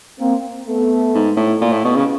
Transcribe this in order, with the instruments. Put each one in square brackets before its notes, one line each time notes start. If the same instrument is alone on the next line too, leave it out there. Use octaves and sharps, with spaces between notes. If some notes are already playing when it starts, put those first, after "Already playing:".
[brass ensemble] A#3 C4
A3 B3
[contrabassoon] G#2
A2
A#2
A2
B2
C#3